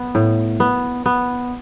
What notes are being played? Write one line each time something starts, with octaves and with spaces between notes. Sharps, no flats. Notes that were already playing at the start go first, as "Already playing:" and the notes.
Already playing: B3
A2
B3
B3